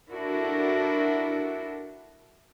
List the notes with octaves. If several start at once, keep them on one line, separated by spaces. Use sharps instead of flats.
D4 E4 F#4 A4 A#4